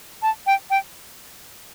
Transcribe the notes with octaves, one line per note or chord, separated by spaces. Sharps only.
A5
G5
G5